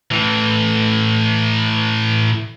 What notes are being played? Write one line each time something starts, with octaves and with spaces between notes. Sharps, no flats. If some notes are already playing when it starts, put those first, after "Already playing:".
A2 E3